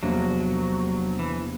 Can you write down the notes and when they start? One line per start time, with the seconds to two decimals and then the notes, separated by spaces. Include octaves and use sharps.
0.02 E2 C3 F3 F#3 A#3 D4
1.19 E3